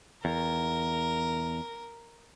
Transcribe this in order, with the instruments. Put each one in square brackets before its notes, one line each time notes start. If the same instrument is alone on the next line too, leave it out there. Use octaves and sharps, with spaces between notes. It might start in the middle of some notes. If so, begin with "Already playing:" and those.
[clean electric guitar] E2 [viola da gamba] A#4